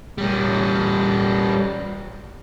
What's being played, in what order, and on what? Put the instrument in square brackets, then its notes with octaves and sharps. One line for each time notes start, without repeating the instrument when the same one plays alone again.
[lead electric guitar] G3 C#4